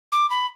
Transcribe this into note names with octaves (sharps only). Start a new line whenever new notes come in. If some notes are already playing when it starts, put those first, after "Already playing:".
D6
B5